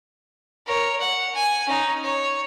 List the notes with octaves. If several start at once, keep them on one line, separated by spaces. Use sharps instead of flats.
A#4 C#5
F#5
G#5
C#4 D#4
C#5